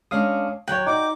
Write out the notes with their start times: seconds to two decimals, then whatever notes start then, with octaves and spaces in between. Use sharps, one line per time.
0.11 G#3 C#4 D4 F5 D#6
0.68 D#2 F#3 C#5 G5 F#6
0.87 D#4 F#4 D5 D6